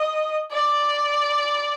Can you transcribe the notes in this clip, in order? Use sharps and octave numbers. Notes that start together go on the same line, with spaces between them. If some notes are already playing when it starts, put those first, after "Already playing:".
Already playing: D#5
D5